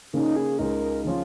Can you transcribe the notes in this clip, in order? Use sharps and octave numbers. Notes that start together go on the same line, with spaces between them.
C#3 A#3 C#4 D#4
G#4
C#2 C#3 G#3 D#4 A#4
C#3 F3 C#4 F4